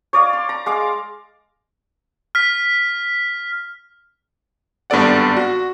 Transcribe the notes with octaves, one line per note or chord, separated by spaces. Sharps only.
C#5 D5 F5
C6
A#5
G#3 F5 D6
F6 B6
G#1 G2 B3 A4 D5 F#5
F#4